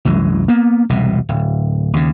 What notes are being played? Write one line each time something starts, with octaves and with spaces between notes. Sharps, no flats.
C2 F#2 E3 G#3
A#3 B3
E1 C2 B2
D1
D#2 C#3